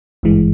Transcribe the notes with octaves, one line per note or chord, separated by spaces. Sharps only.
G#1 G2 E3 G#3